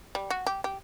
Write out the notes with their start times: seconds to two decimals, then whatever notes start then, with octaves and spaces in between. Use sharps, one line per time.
0.15 G3
0.30 F#4
0.47 G4
0.64 G4